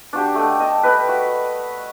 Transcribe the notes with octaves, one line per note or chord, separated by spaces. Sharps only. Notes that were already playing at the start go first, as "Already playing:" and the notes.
D4 F#4 G4
A3 D#5 G5
D#5 A5
B4 D#5 G5
F#4